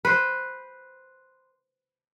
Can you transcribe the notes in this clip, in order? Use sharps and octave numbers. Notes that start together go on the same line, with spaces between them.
B4 C5